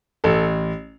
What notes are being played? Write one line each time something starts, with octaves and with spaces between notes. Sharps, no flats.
A1 A4